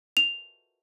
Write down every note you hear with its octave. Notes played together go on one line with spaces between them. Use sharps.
F7